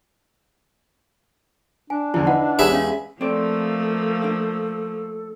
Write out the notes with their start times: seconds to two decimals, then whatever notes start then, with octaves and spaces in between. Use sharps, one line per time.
1.90 D4 G#5
2.14 E2 D3 F3 E4
2.27 D#4 E4 B4 F#5
2.59 E2 G#3 G4 G#4 B4 C#5 E5
2.73 C#4 F5
3.21 F3 A3 A#3 C4 A4 D5
4.22 D4 F5